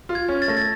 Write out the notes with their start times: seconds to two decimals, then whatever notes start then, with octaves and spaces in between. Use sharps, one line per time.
0.09 F4
0.15 G#6
0.29 C#4
0.42 A6
0.48 A3 A#6
0.57 A6